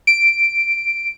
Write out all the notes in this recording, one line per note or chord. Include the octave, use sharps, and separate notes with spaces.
D7